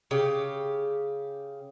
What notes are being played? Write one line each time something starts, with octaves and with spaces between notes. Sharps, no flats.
C#3 G4